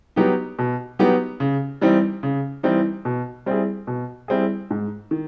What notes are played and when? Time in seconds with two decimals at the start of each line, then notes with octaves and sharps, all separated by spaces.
0.16 F#3 B3 D#4 G4
0.59 B2
0.99 F#3 B3 D#4 G4
1.40 C#3
1.81 E3 G3 C4 D#4
2.23 C#3
2.63 E3 G3 C4 D#4
3.05 B2
3.46 G3 C4 E4 G#4
3.87 B2
4.28 G3 C4 E4 G#4
4.70 G#2
5.11 D#3